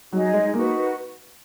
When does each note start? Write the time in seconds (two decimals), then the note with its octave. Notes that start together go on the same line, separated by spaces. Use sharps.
0.12 F#3 D#4 G#4 D#5
0.33 G#3
0.54 A#3 D#4 F#4 B4